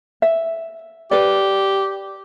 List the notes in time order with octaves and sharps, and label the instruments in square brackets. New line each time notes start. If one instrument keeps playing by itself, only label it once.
[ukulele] E5
[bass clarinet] G4 [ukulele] B4 D5